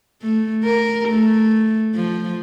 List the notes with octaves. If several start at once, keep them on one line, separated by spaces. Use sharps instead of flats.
A3
A#4
A3
F3